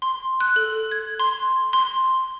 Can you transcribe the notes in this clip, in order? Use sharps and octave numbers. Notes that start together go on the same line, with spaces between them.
C6
F#6
A4
G#6
C6
C6